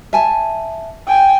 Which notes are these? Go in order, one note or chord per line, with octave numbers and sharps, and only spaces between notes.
E5 G#5 A5
G5 G#5